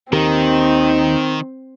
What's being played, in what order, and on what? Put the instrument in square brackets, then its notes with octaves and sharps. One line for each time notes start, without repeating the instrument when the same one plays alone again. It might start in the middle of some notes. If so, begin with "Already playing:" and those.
[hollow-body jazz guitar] D#2 G4 A#4 [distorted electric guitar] D#3 [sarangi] C4 [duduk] D#4